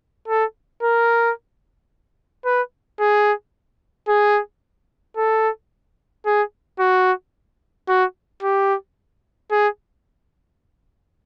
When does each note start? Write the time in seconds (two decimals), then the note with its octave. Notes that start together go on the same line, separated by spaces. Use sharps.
0.28 A4
0.83 A#4
2.45 B4
3.00 G#4
4.08 G#4
5.17 A4
6.26 G#4
6.80 F#4
7.88 F#4
8.43 G4
9.52 G#4